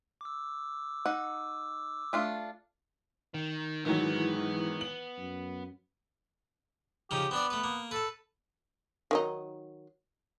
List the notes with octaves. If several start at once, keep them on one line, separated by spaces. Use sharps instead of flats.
D6 E6
D#4 F#5
A3 D4 F4
D#3
G#2 D#3 E3 F#3 B3
F#7
F#2
C#3 F3 D#4 G4
B3 C4 D4 D5
A3 B4
A#3
A4 B4 A5
D#3 F#3 D#4